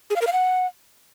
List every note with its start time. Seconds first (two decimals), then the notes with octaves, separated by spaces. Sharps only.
0.10 G#4
0.16 F5
0.21 A#4
0.27 F5
0.33 F#5